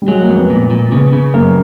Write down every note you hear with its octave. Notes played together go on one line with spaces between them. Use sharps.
G3
F#3 G#3
A#3
F2
B3
A#2
A#2
C#3 B3
C#3
F#2 A#3